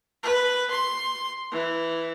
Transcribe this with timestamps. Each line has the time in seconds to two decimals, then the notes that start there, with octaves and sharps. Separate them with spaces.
0.23 B4
0.71 C6
1.52 E3